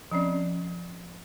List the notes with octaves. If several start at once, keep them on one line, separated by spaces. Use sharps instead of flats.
F3 C4 C#4 D5